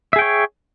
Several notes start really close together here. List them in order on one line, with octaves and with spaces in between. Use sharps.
E5 G#4 G5 C#5